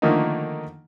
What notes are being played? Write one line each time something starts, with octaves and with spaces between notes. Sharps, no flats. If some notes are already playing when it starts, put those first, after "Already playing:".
D3 D#3 F3 A3 A#3 D#4